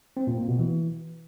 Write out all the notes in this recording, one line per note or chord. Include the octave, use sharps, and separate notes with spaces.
C4
A#2
A#3
B2
E3